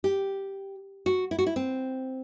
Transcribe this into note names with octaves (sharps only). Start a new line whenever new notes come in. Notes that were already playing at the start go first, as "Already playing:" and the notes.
G4
F#4
E4
F#4
E4
C4